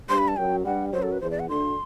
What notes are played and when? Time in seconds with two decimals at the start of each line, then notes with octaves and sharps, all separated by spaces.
0.09 G2 G3 C6
0.18 B5
0.28 A5
0.36 F#2 F#3 G5
0.65 G2 G3 F#5
0.92 F#2 F#3 C5
1.02 A4
1.12 B4
1.21 E2 E3 C5
1.31 D5
1.39 F#5
1.49 D2 D3 C6